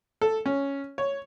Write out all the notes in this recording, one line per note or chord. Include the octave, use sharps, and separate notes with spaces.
A4
C#4
C#5